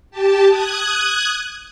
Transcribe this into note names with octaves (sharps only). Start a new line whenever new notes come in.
G4 A5
D#6 F#6 G#6